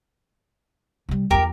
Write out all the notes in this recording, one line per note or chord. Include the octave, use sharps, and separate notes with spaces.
C3 G3
E2 F3 G4 A#4